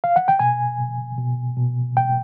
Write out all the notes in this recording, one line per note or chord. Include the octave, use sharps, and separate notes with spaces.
F5
F#5
G5
B2 G#5
B2
B2
B2
B2 G5